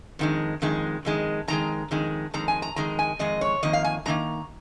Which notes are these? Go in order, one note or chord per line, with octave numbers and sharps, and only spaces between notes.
F2 D#3 G#3
F2 D#3 G#3
F2 D#3 G#3
F2 D#3 G#3 A#5
F2 D#3 G#3
F2 D#3 G#3 A#5
G#5
A#5
F2 D#3 G#3 A#5
G#5
F2 D#3 G#3 D#5
C#5
F2 D#3 A#3 D#5
F5
G#5
F2 D#3 A#3 A#5